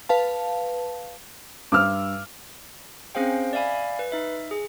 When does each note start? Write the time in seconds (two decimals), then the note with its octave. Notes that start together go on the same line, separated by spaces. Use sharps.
0.09 B4 F5 A5
1.72 G2 D6 E6 F6
3.15 C4 C#4 G#4 C5 F5 G5
3.53 D5 E5 F5 G#5 B5
3.99 B4
4.12 D#4 E5
4.51 G#4